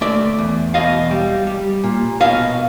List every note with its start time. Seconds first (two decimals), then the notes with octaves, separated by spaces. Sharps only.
0.01 A3 D5 E5
0.39 E2
0.74 B2 D#5 F5
1.11 G3
1.47 G3
1.84 A#2
2.20 B2 D#5 F5